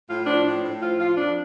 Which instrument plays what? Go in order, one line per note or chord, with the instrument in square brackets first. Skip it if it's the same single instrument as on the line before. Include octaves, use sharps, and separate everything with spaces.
[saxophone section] A2 F4
F3 D4
A2 D4
A2
F3 F4
F3 F4
F2 D4